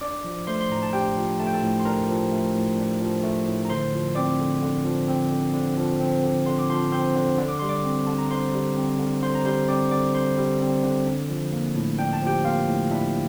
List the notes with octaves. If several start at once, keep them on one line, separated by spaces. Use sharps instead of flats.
D4 D5 D6
F3
A3 C5 C6
C6
A2 A#5
A5
D4 G4 G5
F3
A3 A5
G5
A4 A5
A2
C6
D4 A#4 A#5
F3
A3
A2
D4
F3
A3
A2
A#5
D3 C5 C6
F3
C4 D5 D6
D3
D3
F3
C4
D3
D3
F3
C4
D3
D3 C6
D6
F3 C5 C6
C4 C5 C6
D3
D3
D6
G3 C6
D5 D6
C4
D3 A5
A#5
D3 C5 C6
G3
C4
D3
D3 C5 C6
A#5
G3 C5 C6
C4 D5 D6
D3 D5 D6
D3 C5 C6
G3
C4
D3
D4
F3
A#3
A2
D4 G5
A5
F3 G4 G5
A#3 F4 F5
A2
D4 E4 E5